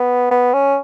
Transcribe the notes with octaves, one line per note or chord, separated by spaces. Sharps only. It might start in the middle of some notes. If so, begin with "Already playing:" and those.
Already playing: B3
B3
C#4